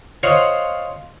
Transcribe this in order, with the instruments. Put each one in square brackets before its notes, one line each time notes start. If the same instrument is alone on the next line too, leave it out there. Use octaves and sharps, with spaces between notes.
[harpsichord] F4 C5 C#5 D#5 F5 F#5